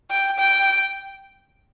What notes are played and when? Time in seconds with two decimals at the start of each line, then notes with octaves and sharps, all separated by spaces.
0.10 G5
0.38 G5